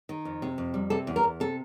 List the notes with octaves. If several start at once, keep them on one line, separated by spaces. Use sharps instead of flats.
D#3
F2
C3
F2
G3
C3 A4
E2
A#4
E2
C3 A4